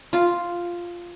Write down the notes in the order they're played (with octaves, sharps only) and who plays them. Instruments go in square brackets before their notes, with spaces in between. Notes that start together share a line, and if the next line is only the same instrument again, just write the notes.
[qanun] F4